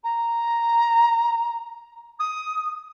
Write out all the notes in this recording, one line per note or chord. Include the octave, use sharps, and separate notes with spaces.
A#5
D#6